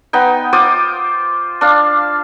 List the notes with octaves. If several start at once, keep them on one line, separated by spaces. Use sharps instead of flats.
B3 D#4 G5
F4 C5 D6 D#6
D4 F5